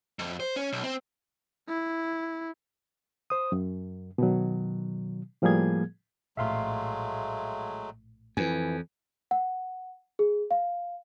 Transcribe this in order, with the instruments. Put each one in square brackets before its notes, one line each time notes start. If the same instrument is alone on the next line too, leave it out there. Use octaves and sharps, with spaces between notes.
[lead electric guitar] F2
C5
C#4
B1
C4
[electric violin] E4
[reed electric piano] C5 D#6
F#2
B2 D#3 F#3
A2 F3 G3 A#3 G#4 G#6
[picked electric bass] A#1 A2 [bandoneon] F#3 G#3 A3 [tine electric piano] E5 F5 C6
[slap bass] F2 [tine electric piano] E3 G#5
[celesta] F#5
G#4
F5